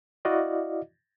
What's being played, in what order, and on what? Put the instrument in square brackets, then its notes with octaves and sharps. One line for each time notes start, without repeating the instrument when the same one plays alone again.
[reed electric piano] E4 F#4 D5 D#5 F5